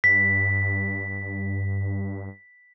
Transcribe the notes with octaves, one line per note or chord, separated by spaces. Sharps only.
G2 B6